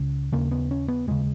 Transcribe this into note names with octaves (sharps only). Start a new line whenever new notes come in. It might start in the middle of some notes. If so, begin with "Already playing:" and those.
Already playing: C#2 C#3
D#2 C#3 A#3
B3
C#4
B3
D#2 C#3 G#3